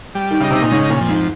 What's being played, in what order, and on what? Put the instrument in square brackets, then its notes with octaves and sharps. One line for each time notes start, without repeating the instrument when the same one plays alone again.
[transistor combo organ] G3
[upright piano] D#3
[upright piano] C#3 [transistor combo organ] D#4
[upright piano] C3
A#2
[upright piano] G#2 [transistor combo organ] C#3
[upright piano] A#2
[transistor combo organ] F2
[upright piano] G#2